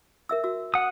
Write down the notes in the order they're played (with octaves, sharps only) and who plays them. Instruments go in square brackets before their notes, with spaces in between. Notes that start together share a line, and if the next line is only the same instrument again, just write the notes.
[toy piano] A#4 E5 E6
F#4 E6
[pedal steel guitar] F#5 D#6